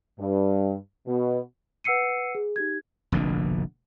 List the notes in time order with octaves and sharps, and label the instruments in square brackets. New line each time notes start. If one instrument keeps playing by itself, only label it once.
[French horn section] G2
B2
[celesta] B4 F#5 E6 C7 C#7 D#7
G#4
D#4 G4 G#6
[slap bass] F1 A#1 B2 D3